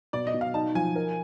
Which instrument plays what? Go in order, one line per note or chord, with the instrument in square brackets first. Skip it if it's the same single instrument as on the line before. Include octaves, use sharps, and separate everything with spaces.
[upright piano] B2 [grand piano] D5
[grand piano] D#5
[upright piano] B2
[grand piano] F5
[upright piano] D#4 [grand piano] A5
[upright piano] F3 [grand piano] G#5
[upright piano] A#4